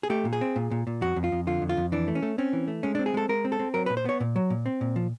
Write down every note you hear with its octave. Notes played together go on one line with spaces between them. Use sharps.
G#4
A3 G4
A#2
G#4
C4
A#2
A#2
A#2
F2 F#4
F2
F4
F2
D3 F4
F2
F4
F2
E3 D4
A3
C#4
A3
C4 C#4
E3
A3
G#3 C#4
D4
C4
G#4
G#3 A4
G#3 A#4
C4
A4
C4
F#3 A#4
B4
A#2
C5
B3 C#5
A#2
F#3
A#2
C4
A#2
F3